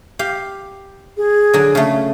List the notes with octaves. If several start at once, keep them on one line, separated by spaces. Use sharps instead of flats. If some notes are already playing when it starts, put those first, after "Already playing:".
G4 F5
G#4
D3 F#3
C#3 A3